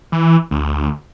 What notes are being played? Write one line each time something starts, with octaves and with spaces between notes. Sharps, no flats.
E3
D2